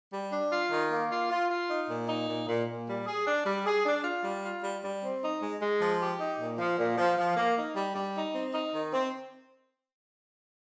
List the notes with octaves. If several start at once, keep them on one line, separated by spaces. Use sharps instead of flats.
G3
D4
F4
D#3
A#3
F4
F4
F4
D#4
A#2
D#4
A#2
A#2
A#2
G3
G#4
D4
G3
G#4
D4
F4
G3
F4
G3
G3
C4
D#4
G#3
G#3
F3
G4
D#4
A#2
F3
A#2
F3
F3
A#3
D#4
G3
G3
D#4
C4
D#4
D#3
C4